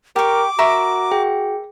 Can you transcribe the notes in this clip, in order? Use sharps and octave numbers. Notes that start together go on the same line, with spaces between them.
G4 A#4 C#6 D6
F#4 A#4 E5 A#5 C#6 D7
G#4 G5